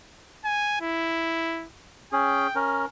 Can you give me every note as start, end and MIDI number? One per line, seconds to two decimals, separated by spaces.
0.45 0.81 80
0.81 1.67 64
2.12 2.47 61
2.12 2.47 68
2.12 2.59 79
2.55 2.85 61
2.55 2.85 70